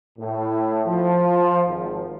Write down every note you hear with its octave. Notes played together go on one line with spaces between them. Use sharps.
A2
F3
G#1